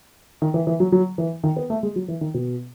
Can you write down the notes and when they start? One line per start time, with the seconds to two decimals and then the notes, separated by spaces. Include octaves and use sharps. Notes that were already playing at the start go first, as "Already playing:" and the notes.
0.42 D#3
0.54 E3
0.67 E3
0.80 F#3
0.92 F#3
1.18 E3
1.44 D#3
1.57 B3
1.70 A3
1.83 G#3
1.96 F#3
2.08 E3
2.21 D#3
2.34 B2